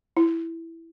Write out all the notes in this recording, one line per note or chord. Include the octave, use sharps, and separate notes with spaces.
E4